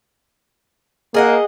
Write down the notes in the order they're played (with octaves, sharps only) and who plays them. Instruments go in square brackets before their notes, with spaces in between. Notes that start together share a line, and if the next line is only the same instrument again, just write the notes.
[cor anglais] A#3 [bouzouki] G#4 D#5 F#5